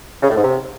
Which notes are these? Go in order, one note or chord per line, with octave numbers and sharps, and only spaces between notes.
C#3
A2
G#2
C3